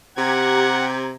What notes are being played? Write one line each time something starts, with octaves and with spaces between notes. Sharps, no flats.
C3 G4 F#5 A#5 G#6